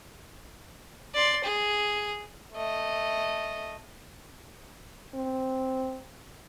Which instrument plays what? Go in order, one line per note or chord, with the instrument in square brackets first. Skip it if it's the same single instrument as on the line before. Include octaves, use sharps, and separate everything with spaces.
[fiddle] D5 C6
G#4
[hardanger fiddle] A3 D#5
[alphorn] C4